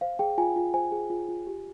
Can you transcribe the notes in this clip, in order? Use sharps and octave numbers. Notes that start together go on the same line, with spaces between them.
C5 F5
G#4 G5
F4 G#5
F4
C5 G#5
G#4
F4
F4
G4